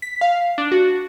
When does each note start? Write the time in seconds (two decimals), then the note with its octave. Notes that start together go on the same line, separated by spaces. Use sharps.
0.02 B6
0.21 F5
0.58 D4
0.72 F#4